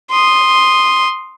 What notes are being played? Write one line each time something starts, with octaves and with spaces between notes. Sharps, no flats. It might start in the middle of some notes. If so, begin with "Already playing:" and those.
C6 D#6